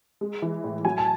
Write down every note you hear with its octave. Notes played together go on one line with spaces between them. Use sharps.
G#3
E3
A2
F#3 G#5
A5